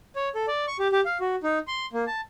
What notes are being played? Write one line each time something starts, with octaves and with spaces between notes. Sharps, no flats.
C#5
A4
D5
C#6
G4
G4
F5
F#4
D#4
C6
A#3
A5